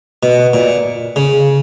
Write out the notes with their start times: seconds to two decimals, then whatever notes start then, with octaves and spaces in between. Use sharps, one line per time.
0.23 B2
0.53 A#2
1.16 C#3